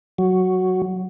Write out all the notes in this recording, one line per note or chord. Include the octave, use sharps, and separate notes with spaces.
F#3